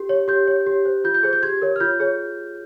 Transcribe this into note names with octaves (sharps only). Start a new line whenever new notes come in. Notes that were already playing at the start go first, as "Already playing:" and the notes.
Already playing: G4
C#5
G4 G6
C#5
G4
C5
F4 G6
G6
G#4 C5
G6
G4 G#6
A#4 C#5
F6
F4 G6
G#4 C#5